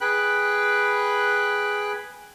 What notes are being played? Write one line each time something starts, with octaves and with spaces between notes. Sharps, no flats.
G#4 B4 G5 B5 F#6